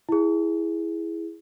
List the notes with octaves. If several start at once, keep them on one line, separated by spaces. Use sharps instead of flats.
E4 G#4